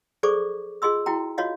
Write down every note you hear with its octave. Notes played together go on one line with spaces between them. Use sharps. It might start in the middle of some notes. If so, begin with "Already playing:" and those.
G#4 A4 C5 D5 C#6 D6
F4 G#4 D#5 C6 E6
E4 F#4 G5 A#5
F4 F#4 C#5 D#5 F5